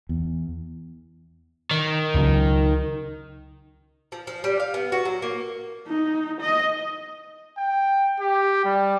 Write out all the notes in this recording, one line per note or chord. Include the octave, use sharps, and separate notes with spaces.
E2
D#3
C#2 C#3 F#3
F3
F3
G3
F5
B3
F#4
F#3
A#3
D#4
D#5
G5
G4
G3